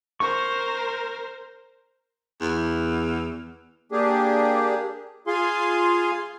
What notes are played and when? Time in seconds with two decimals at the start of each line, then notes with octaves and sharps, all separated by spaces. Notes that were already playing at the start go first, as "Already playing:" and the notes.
0.20 A#4 C5 C#6
2.41 E2
3.92 A#3 D4 G4 G#4
5.27 F4 G#4 F5 G#5 C6